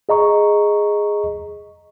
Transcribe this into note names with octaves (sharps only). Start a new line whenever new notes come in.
G#4 D#5 A#5 C#6